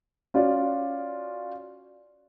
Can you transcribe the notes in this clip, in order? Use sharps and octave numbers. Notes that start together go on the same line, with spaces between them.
C#4 F4 F#4 D5